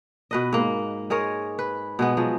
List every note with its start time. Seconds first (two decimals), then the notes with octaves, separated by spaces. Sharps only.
0.31 B2 B4 D#5
0.53 G#2 A#3
1.10 G#3 G#4 A#4 C#5
1.59 B4
1.99 B2 G#3 B3
2.17 F3 F#3 G#3